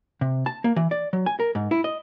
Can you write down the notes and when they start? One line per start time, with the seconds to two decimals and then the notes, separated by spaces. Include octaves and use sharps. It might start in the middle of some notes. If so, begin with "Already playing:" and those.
0.21 C3
0.46 A5
0.64 A#3
0.76 E3
0.91 D5
1.13 F#3
1.26 G#5
1.40 A#4
1.55 G#2
1.71 E4
1.84 D#5